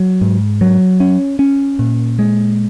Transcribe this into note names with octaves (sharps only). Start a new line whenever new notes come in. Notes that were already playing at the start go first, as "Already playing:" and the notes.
Already playing: F#3
G#2
F#3
C#4
C#4
A#2
G#3